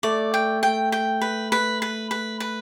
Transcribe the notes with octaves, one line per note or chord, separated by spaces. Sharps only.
A3 D5
G5
G5
G5
B4
B4
B4
B4
B4